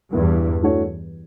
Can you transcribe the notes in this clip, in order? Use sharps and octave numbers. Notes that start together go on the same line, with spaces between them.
E2 G2 B3 E4 B4
E3 A3 D4 F#4 C#5